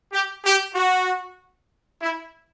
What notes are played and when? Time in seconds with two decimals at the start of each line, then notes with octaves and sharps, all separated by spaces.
0.13 G4
0.44 G4
0.75 F#4
2.01 E4